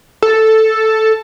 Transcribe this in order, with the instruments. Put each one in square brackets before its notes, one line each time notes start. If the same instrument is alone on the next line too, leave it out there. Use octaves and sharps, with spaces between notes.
[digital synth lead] A4